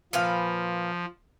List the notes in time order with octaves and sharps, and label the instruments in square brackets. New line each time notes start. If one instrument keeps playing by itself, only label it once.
[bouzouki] A#2 B4 F5 [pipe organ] F3